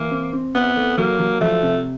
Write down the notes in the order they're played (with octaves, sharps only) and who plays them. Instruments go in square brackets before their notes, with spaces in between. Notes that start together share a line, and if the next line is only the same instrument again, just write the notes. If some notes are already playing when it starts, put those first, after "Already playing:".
Already playing: [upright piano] E3 [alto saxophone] A#3
[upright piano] C4
C4
[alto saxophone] B3 [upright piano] C4
[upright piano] A3
[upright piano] F#3 [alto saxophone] A#3
[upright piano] F#3
[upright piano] F3 [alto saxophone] A3
[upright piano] C3